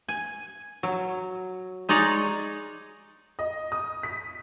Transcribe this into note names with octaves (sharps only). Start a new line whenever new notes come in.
G#5
F#3
G#3 D#4 C#5 D5 A#5
D#5
D#6
B6